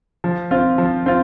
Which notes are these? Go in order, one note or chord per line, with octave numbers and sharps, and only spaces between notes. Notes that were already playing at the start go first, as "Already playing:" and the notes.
F3
C4 F4
F3
C4 F4